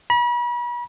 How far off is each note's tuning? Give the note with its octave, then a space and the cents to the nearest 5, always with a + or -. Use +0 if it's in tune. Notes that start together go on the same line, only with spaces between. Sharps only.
B5 -40